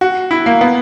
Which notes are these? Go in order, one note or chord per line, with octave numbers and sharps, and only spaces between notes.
F#4
E4
A#3
B3